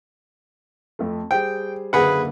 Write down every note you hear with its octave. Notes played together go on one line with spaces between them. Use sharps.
F2 A3
G3 G#4 C5 G5
F#1 D3 A#3 G#4 B4 F#5